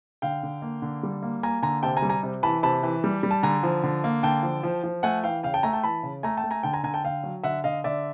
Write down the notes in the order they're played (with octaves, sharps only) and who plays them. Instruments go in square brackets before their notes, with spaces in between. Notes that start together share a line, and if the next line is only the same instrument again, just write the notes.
[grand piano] D3 F5 G5
D3
A#3
D3
G3
A#3
A#3 G#5 A#5
D3 G#5 A#5
C3 G5 A5
G#5 A#5
G3
G#5 A#5
C3
E3 A5 B5
C3 A5 B5
E3
G3
G3
A5
D3 G#5 A#5
F3
D3
A#3
D3 G5 A5
F3
F3
F3
A3 F#5 G#5
E3 F5 G5
C#3 F5 G5
G5 A5
A3 G#5 A#5
G5 A5
E3 A5 B5
C#3
A3 G#5 A#5
G5 A5
A3
G#5 A#5
D3 G5 A5
G#5 A#5
D3 G#5 A#5
G5 A5
D3 F5 G5
F#3
D3 E5 F#5
D3 D#5 F5
D3 D5 E5